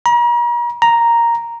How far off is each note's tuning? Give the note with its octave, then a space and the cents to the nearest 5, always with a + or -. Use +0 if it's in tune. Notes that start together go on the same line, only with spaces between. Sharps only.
A#5 +40
A#5 +0